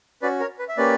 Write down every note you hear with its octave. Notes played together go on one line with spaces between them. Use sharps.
C#4 F#4 B4 D5
A#4 C#5
B4
E5
A#3 C#4 G4 B4 D5